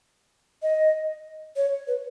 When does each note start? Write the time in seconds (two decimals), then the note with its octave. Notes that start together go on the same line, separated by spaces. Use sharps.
0.62 D#5
1.56 C#5
1.87 B4